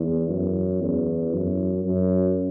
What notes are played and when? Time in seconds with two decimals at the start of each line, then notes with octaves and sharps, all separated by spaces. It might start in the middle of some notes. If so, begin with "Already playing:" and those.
Already playing: E2
0.29 F#2
0.81 E2
1.33 F#2
1.85 F#2